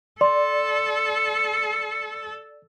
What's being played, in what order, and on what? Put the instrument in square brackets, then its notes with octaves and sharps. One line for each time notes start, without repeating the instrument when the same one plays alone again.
[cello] A4 [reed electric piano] D5 [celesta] C6